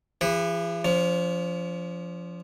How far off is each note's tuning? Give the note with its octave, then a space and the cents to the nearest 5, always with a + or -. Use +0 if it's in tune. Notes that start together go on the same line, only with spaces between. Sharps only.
E3 +45 G#4 -35 B4 +0
F3 -5 C#4 +45